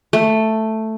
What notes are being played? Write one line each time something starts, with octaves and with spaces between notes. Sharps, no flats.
A3